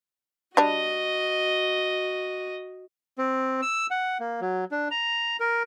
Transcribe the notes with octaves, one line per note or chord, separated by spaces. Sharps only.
G3 D4 F#4 D#5
C4
E6
F#5
A#3
F#3
D4
A#5
A#4